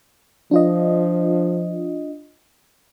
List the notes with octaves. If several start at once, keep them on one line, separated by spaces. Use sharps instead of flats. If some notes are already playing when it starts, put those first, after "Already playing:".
F3 D4 F4 D#5